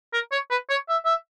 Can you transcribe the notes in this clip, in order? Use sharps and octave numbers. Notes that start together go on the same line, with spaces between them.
A#4
C#5
B4
C#5
E5
E5